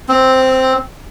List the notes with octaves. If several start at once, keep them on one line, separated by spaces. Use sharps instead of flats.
C4